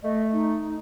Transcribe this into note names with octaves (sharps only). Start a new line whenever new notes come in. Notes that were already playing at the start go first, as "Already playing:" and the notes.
A3 D#5
D#4